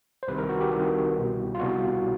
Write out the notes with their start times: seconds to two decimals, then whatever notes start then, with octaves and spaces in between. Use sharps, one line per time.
0.23 C5
0.28 C2 C3 D#3 B4
0.38 A#4
0.49 F#4
0.61 G4
0.72 C2 C3 D#3
1.15 C2 B2
1.55 F4
1.60 C2 B2 F#4